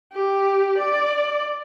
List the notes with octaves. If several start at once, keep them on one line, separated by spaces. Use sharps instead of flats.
G4
D5